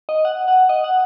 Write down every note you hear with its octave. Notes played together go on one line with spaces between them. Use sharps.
D#5
F#5
F#5
D#5
F#5